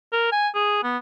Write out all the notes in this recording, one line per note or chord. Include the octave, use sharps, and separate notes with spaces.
A#4
G#5
G#4
B3